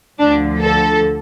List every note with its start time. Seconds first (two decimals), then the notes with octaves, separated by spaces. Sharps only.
0.19 D2 D3 F3 D4
0.61 A4